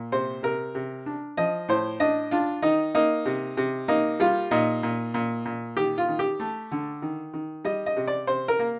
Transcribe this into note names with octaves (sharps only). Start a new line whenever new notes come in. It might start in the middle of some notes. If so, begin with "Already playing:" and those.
Already playing: A#2
C3 C5
C3 A#4
C3
D4
F3 D#5
A2 C5
D4 D#5
D4 F4
D#3 D#4
A#3 D#4
C3
C3
A#3 D#4
G3 F4
A#2 D#4
A#2
A#2
A#2
D#3 G4
F4
D#3
G4
A3
D3
D#3
D#3
G3 D#5
D#5
C3
D5
C3 C5
A#4
A#3